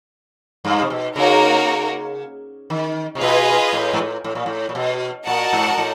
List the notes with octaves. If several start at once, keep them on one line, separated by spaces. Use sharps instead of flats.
G2
C3
B2
C#3 A#3 D#4 F#4 A#4 C#5
D#3
C3
B2 F4 G#4 B4 D#5 G#5
A2
G#2
A2
A2
A#2
A2
A#2
B2
A#2 F#4 A#4 D#5 F#5 A5
G#2
A2